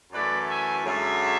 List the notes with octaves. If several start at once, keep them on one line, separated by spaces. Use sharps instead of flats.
F#2 E3 A3 B4 D5
E5 G#5
F#2 D3 G#3 C#5 E5